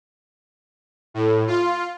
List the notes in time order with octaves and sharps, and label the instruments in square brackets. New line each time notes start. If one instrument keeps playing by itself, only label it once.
[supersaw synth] A2
F4